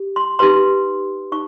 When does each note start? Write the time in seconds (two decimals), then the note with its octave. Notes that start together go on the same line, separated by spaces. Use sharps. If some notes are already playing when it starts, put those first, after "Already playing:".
Already playing: G4
0.16 C6
0.39 D#4 G4 B4 C6
1.32 D#4 C#6